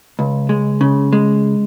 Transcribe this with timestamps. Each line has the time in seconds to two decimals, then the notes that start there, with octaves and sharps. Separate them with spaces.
0.19 C#2
0.49 G#3
0.81 C#3
1.13 G#3